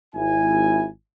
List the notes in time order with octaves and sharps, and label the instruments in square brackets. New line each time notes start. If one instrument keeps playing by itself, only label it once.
[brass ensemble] G#1 E4 G#5